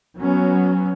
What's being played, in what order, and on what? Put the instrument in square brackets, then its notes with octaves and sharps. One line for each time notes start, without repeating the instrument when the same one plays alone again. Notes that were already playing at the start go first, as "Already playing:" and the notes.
[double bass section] F#3 B3 C#4